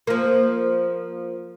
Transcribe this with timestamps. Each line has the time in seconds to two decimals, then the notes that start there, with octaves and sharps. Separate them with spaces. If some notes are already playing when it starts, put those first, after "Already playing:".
0.07 F3 A#3